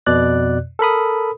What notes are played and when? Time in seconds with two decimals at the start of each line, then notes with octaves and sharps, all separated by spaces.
0.06 F2 B2 D5 F#6
0.79 A4 A#4 B5 D#6